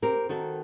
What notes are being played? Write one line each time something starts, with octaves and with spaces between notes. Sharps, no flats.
C4 G4 A#4
D#3 F#4 A4